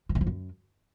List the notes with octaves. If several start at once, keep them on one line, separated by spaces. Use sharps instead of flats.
E3
D#3
F3
F#2